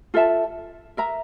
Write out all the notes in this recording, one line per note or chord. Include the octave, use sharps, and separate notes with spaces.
F4 A4 E5 A5
A#4 E5 A#5